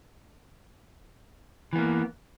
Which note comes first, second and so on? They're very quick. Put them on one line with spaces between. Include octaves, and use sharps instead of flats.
E3 B3 A#3